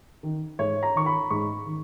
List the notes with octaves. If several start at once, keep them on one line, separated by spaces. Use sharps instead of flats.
D#3
G#2 C#5
A#5
D#3 C#6
B5
G#2 C#6
D#3